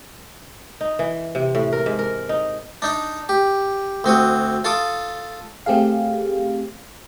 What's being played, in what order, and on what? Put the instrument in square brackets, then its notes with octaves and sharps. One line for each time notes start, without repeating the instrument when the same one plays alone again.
[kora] D#4
E3
C3
A2
A#4
G#2
A#4
D#4
[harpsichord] D4 D#4 A#5
G4
D2 C4 F#4 D#6
F4 A4 D6 D#6
[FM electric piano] A3 C4 G4 G#4 F5